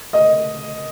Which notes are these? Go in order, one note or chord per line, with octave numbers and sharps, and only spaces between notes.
D#5